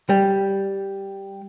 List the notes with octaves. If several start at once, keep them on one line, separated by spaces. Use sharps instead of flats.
G3